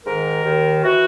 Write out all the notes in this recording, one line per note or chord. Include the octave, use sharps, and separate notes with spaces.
G#2 D#3 A#4
D#2 D#3
E3 F#4